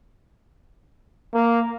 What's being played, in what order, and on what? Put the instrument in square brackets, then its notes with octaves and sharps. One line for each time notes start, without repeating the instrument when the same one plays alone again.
[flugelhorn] A#3